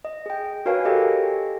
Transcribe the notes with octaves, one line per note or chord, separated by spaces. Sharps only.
D#5
G#4 G5
F#4 A#4 B4 C#5 F5 G#5
G4 A4 D#5 G5